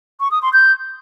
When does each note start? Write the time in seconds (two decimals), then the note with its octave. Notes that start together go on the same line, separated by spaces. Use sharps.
0.20 C#6
0.31 D#6
0.42 C6
0.53 G6